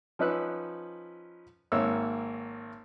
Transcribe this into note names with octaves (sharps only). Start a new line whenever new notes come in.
F3 C#4 D#4 B4 E6 F#6
G#1 A#3 C#5 E6